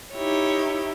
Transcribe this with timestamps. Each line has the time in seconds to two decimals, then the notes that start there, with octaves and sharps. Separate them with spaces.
0.15 D#4 E4 G4 C#5